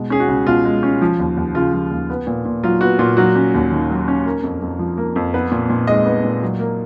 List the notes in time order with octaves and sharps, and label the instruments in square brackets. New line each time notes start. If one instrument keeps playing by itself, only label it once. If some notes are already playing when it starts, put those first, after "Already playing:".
Already playing: [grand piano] B2 G#3
C#4 G#4
F#4
C#2
B2 F4
G#3
C#4
F3
D#2
D#2
C#3 F4
F3
D#2
B3
A#2
A#2
F#3 F4
B3 F#4
A#2 F4
F#3 F#4
C#4
D#2
D#3
F#3
C#4
A#3
F2
F2
F3
A#3
F2
B3 B4
A#2
A#2
G#3 D#5
B3
A#2
F#3
A#3